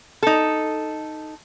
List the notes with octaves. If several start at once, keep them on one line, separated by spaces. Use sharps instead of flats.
D#4 A4